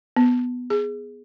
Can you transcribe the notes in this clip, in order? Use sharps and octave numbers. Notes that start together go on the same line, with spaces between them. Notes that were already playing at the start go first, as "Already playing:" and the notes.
B3
G#4